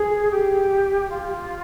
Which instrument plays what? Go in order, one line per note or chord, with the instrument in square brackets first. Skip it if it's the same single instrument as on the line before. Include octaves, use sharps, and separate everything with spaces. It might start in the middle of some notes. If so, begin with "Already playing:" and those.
Already playing: [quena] G#4
G4
F4